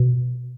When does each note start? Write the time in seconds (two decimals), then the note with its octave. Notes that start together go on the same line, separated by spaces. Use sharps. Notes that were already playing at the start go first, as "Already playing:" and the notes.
Already playing: B2